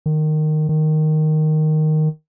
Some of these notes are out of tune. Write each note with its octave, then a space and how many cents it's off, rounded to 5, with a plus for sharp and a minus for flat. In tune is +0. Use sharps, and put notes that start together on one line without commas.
D#3 -15
D#3 -5